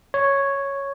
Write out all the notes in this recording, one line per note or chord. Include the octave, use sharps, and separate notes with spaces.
C#5